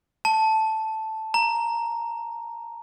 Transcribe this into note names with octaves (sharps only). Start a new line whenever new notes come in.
A5
A#5